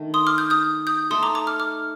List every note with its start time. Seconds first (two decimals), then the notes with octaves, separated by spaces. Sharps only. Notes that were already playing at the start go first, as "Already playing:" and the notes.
Already playing: D#3 A3 D4
0.14 C6 D#6
0.27 D6 F6
0.38 D#6 G6
0.50 D#6 G6
0.87 D#6 G6
1.10 A3 D#4 A4 C6 D#6
1.23 A#5 D6
1.35 A#5 D6
1.47 D6 F6
1.60 D6 F6